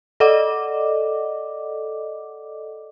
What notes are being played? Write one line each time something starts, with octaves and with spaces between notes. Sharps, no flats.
A4 D5 D#5 F#5 D6